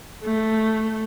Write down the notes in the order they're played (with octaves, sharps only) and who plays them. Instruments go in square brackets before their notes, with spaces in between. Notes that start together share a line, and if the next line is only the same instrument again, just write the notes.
[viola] A3